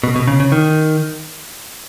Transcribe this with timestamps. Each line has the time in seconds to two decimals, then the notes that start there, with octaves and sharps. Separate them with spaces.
0.03 B2
0.16 B2
0.28 C#3
0.40 C#3
0.52 D#3